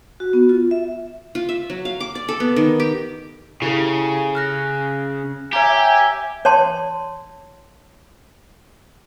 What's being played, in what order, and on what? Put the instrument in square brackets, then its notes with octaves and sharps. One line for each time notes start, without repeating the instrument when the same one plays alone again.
[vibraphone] F#4
B3
F4
E5
[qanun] F4
E5
F#3
F5
D6
D5
A4
B3
D#3
G4
[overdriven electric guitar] C#3 [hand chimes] E4 G4 A4
[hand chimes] F6 F#6 A#6
[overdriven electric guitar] G4 [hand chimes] C#5 A#5 [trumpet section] E5 G#5
[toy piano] C#5 D5 A5 C6